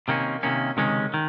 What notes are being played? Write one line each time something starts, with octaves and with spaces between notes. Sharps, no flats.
C3 D#3 A#3 C#4
C3 D#3 A#3 C#4
C#2 C3 D#3 G#3 C#4
D#3